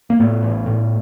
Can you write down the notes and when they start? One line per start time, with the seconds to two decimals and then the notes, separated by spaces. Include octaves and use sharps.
0.10 A#3
0.20 A2 A3 B3
0.43 A1
0.66 A2